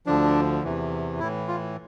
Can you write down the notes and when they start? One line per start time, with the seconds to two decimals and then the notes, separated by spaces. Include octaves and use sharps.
0.06 D2 D3 F3 D4
0.64 E2 C3 E3
1.19 A2 E3 E4
1.48 F4